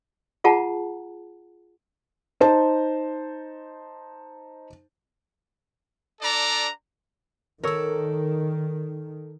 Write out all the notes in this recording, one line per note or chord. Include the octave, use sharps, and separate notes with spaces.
F4 G#4 F#5 A5 A#5
D#4 C5 A5
D4 A4 D5 A#5
D#3 A4 A#4 C#5 D5 E6